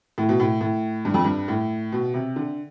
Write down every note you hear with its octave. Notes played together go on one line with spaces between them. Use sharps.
A2
B2
A2
A2
G2
F2
G2
A2
B2
C3
D3